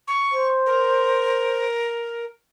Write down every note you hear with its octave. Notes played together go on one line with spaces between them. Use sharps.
C#6
C5
A#4